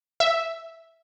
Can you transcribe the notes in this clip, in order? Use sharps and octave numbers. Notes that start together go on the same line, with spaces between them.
E5